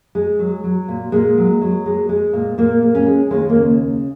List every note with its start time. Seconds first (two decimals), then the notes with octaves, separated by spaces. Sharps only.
0.15 G#3
0.39 F#3
0.64 F#3
0.88 A#2
1.12 A#2 G#3
1.37 F#3
1.61 F#3
1.86 G#3
2.09 G#3
2.33 A#2
2.58 A#2 A#3
2.83 G#3
2.95 C#4
3.06 G#3
3.31 D#2 G#3
3.49 A#3
3.55 C#3